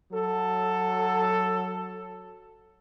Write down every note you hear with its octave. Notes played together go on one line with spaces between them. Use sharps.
F#3 A4